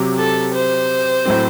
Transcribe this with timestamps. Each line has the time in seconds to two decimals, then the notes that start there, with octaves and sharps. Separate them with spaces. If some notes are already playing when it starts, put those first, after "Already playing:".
Already playing: C3 F#3 C4 G4
0.18 A4
0.55 C5
1.25 A2 F#3 C4